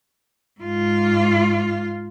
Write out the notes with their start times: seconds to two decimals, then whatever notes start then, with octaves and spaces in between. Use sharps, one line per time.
0.61 G#2 F4